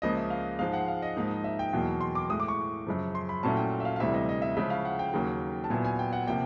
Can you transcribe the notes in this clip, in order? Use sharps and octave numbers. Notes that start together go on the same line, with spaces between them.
C#2 C#3 F3 A#3 D#5
E5
F5
G#2 F3 G#3 F5
F#5
F5
D#5
G#2 F3 A#3 D#4
E5
G5
E2 B2 F#3 A#3
C6
D6
A2 E3 G#3 D#6
D6
C#6
F#2 C#3 F3
C6
B5
A#2 F#3 A3 C#4 E4 A5
G5
E5
F5
F5
D2 C3 E3 G3 E5
D#5
D#5
E5
C#3 F3 G#3 C#4 E4 E5
F5
F#5
G5
D#2 C#3 F#3 A#3
A5
A#2 F#3 B3 E4 G#5
G#5
G5
F#5
C3 F3 A#3 G5